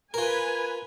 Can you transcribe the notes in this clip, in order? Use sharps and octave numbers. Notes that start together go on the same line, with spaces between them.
F4 A#4 B4 G#5